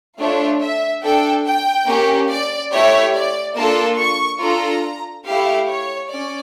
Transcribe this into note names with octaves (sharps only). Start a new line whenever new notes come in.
A3 D4 F4 C#5
E5
D4 A4 G5
G5
A#3 C#4 G4
D5
A3 E4 G4 C#5
D5
A#3 D4 F4 A4 A5
C#6
D4 F4 A4 A#5
A3 E4 G4 F5
C#5
C#4 D5